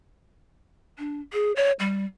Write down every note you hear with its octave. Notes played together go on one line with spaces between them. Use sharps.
D4
G#4
C#5
G3